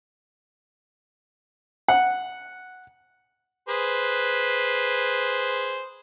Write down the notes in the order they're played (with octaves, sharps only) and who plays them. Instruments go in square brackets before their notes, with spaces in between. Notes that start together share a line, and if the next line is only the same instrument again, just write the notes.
[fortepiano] F#5
[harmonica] G#4 B4 C5